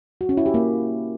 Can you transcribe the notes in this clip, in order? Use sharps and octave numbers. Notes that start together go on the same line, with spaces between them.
F#4
C#4
E4
G4
A#3